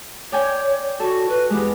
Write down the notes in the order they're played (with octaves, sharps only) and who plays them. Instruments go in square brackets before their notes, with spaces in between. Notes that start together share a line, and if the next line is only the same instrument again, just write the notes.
[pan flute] C#5 [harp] D5 G5 G#5
[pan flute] F#4 [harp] A4
[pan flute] B4
[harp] E2 G#3 [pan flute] G4